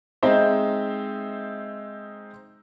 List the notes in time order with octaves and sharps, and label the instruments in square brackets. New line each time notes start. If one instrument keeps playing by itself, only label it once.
[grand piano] G#3 C4 D#4 C5 E5